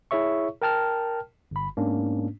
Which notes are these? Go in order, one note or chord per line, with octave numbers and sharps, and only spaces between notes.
E4 G#4 C#5 E5 C#6
A#4 G5 A5 F6
G1 B5
G#2 A#3 B3 C#4 D4